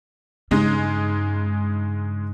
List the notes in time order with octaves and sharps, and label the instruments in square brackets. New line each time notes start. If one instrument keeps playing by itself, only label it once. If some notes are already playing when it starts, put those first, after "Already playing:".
[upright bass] G2 [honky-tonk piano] C#3 G#3 D#4